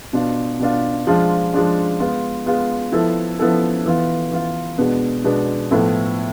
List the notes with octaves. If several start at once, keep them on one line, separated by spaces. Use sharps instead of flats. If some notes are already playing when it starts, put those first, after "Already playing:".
B2 B3 D4 F4
B2 B3 D4 F4
F3 G#3 D4 F4
F3 G#3 D4 F4
G#3 B3 F4
G#3 B3 F4
F3 B3 E4 A4
F3 B3 E4 A4
E3 B3 F4
E3 B3 F4
B2 G#3 B3 D4
B2 G#3 B3 D4
A2 F3 B3 E4 A4